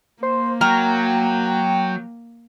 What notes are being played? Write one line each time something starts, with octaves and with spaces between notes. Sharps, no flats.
A#3 C5
F#3 A#4 G5